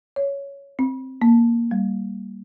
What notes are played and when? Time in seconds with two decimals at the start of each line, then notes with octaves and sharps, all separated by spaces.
0.16 C#5
0.79 C4
1.22 A#3
1.71 G3